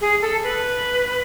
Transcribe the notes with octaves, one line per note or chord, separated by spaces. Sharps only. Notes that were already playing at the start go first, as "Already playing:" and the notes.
G#4
A4
B4